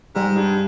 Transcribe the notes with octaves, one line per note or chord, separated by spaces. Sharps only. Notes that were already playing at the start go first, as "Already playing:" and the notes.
G#2 G3
G2